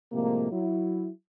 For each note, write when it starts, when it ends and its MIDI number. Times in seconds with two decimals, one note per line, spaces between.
0.12 0.48 45
0.12 0.48 48
0.12 0.48 53
0.12 0.48 56
0.12 0.48 58
0.51 1.09 54
0.51 1.09 64